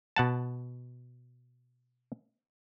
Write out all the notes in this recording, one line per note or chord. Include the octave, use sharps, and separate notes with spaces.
B2 F#5 A5